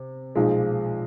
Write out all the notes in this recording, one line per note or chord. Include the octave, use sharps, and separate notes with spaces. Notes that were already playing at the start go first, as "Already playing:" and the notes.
Already playing: C3
B1 A#2 F3 G#3